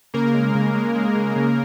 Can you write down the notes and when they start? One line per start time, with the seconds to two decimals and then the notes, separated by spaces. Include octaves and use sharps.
0.14 C#3 A#3 A#4
0.34 G#3
0.55 C#3
0.74 G#3
0.95 G#3
1.16 C#3
1.36 C#3